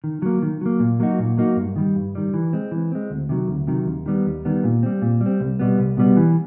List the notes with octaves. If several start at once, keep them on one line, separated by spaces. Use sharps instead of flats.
D#3
F#3 A#3
D#3
F#3 A#3
A#2
F#3 A#3 D#4 F#4
A#2
F#3 A#3 D#4 F#4
G2
D#3 G3
G2
D#3 G3
E3
G#3 C4
E3
G#3 C4
D2
C3 D#3 F#3
D2
C3 D#3 F#3
D#2
D#3 G3 B3
D#2
D#3 G3 B3
A#2
G3 C4
A#2
G3
C4
C2
B2 G3 B3
C2
B2 G3 B3
E3